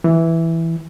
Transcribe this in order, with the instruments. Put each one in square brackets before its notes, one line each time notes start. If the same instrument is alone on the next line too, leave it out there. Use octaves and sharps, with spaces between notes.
[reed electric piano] E3